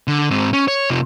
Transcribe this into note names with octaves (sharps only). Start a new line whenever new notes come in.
D3
G#2 C4
C#4
C#5
C3 F4